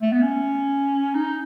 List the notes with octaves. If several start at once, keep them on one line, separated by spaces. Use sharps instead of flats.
A3
B3
C#4
D#4